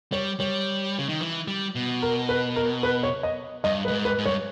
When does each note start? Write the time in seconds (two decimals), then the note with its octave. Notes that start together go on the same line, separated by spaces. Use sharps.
0.12 G3 C#5
0.40 G3 C#5
0.99 C#3
1.09 D#3
1.21 E3
1.48 G3
1.75 B2
2.02 A#4
2.29 B4
2.56 A#4
2.83 B4
3.03 C#5
3.23 D#5
3.64 G2 D#5
3.85 B4
3.88 G2
3.91 G#2
4.05 B4
4.18 G#2
4.26 G2 C#5